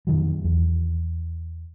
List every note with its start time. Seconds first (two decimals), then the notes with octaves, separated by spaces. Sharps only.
0.07 F2 D#3 F#3
0.44 E2